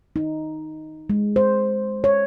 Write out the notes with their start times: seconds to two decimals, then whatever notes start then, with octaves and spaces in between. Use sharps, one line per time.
0.16 D#4
1.10 G#3
1.36 C5
2.04 C#5